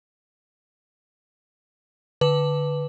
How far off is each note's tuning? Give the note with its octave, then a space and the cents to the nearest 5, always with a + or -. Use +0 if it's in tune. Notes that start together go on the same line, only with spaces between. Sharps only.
D3 +0 B4 +0